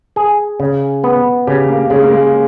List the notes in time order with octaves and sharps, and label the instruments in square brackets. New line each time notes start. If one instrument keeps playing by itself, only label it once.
[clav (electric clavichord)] G#4
C#3
B3
[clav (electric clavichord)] C#3 [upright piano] G4
[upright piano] A#3
[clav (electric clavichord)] C#3 [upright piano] G#3
[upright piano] A#3
G#3